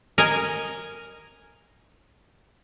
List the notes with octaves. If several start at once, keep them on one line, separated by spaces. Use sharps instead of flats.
A#4 D#5 G#5 A#5